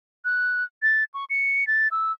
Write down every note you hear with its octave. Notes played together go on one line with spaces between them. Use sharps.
F#6
A6
C#6
C#7
A6
E6